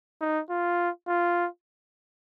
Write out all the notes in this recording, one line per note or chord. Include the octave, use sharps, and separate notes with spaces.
D#4
F4
F4